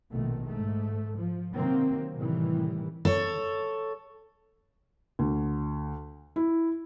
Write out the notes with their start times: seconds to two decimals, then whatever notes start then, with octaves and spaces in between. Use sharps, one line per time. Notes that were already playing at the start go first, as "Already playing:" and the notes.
0.11 A#1 B2 D#3 A3
0.48 G#2 A3
1.18 F3
1.55 C3 D#3 F#3 A#3 C4
2.16 A2 C3 D#3 E3 G3
3.05 A4 C#5
5.19 D2
6.36 E4